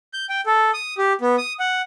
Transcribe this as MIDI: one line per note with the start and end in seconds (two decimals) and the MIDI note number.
0.13 0.26 91
0.29 0.41 79
0.46 0.71 69
0.74 0.94 87
0.98 1.13 67
1.21 1.36 59
1.38 1.53 87
1.60 1.82 78